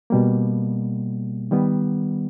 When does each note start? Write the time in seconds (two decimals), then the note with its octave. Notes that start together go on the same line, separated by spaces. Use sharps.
0.10 B2 G3 A#3
1.51 D#3 G3 B3